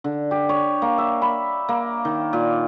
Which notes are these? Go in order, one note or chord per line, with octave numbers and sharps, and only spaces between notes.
D3
G4
C#5
A#3
E5
B5
A#3
D#3
A#2